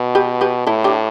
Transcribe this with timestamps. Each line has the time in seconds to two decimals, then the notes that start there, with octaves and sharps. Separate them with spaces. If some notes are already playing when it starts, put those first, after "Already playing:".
Already playing: B2
0.15 G4 B4
0.41 G4 B4
0.67 A2 E4 A4
0.84 D4 G4